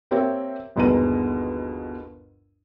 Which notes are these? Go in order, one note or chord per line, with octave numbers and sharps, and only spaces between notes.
A#3 C4 G4 A#4 C#5 E5
G1 D#2 B2 G#3 A#5 D#7